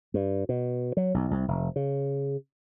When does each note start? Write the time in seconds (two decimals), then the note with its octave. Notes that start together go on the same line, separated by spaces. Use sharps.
0.14 G2
0.49 B2
0.97 F#3
1.14 B1
1.31 C2
1.48 F1
1.76 C#3